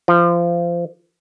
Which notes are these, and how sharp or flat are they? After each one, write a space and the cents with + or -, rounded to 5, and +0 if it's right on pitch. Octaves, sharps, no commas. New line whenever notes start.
F3 -25